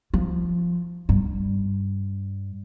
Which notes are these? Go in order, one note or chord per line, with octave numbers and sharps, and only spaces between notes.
F3
G2